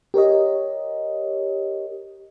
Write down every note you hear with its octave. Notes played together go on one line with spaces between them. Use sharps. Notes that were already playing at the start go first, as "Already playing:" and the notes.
G4 A#4 C#5 D#5